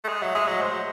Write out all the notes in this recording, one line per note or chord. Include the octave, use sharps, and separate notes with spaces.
A3
G#3
F#3 E5
G#3 E5
F#3 D#5
G#3 C5
F#3